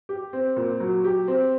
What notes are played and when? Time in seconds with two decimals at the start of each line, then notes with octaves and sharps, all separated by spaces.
0.09 G4
0.33 C4
0.56 A#2
0.80 F#3
1.04 G4
1.28 C4